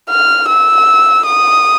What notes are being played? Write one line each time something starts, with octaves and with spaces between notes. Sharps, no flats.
F6
E6
D#6